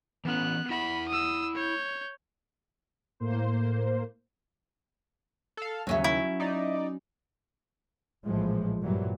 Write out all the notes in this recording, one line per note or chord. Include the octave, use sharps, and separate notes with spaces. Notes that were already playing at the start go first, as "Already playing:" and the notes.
E3 B3 C#4 F#6
E4 F#5 B5
D#6 E6
C#5 G6
A2 A#3 C5
A4 F5
D#2 C#3 F#3 C#4 E5
E4
D#4 D5
A#1 A2 E3 F3 G#3
G2 A#2 E3 F#3 G3